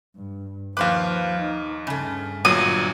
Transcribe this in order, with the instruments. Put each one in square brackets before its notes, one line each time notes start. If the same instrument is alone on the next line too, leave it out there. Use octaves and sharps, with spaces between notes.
[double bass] G2
[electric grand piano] D#2 D6 [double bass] F3 [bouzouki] B4 C5 F5
[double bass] D#4
[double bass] G2 [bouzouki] C#3 A3
[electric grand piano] G1 A#2 F#3 [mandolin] D#6